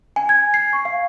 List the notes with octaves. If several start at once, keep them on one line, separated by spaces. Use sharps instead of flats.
G#5
G#6
C7
C#6
F5